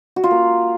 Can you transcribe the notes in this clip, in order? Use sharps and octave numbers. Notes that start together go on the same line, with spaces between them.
F#4
F4
A#3